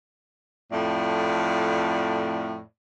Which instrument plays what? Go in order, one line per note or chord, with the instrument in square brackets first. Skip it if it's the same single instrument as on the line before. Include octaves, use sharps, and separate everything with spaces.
[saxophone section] F2 A2 D5